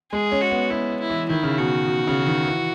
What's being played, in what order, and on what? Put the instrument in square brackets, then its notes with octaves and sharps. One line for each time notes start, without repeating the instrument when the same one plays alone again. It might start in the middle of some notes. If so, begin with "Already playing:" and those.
[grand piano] G#3 [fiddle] G#4
[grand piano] C#4
[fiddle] F#4
[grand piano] B3
[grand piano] B3 [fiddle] E4
[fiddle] E4
[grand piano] E3
[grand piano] D#3 [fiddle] E4
[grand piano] C#3
[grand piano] B2 [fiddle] F#4
[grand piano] B2
C#3
D#3
E3